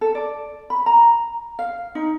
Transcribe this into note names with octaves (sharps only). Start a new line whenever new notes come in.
A4
D5
B5
A#5
F5
D#4